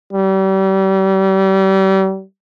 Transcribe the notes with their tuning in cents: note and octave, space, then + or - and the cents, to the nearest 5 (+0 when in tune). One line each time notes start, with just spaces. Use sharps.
G3 -35